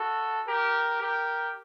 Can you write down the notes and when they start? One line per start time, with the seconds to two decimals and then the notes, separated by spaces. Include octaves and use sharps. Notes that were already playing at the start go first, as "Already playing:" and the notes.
Already playing: F#4 A4
0.47 G4 A#4
1.02 G4 A#4